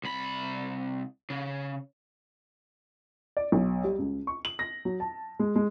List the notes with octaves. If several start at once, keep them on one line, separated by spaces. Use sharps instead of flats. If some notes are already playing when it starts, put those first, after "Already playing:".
C2 B5
C#3
D5
B1
G3
C#2
C#6
F#7
A#6
F#3
A5
G#3
G#3